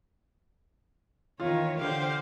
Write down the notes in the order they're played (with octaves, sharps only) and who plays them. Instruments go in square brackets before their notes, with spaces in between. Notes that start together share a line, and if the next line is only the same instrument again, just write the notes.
[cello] E2 D#3 [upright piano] F4 [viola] C#5
[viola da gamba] D3 [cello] G4 [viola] C5 F5